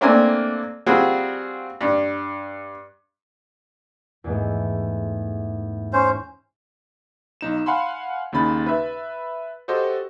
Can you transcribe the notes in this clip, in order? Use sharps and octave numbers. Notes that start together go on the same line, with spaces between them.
A3 A#3 C4 D4 A#4 G#5
G3 C4 F4 F#4 G#4
G2
E2 G#2 A3
C#4 C5
B1 D#4 E7
F5 F#5 G#5 B5 C6
D#2 C#3 D#4 B5 A6
B4 E5
F#4 G4 A4 C5 D#5